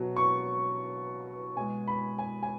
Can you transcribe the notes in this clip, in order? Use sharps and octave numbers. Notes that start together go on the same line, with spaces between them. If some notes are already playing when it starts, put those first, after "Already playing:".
Already playing: B2 F#3
C#6
B2 G#3 G#5
B5
G#5
G#5